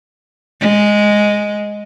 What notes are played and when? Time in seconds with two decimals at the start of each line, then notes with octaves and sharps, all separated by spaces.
0.61 G#3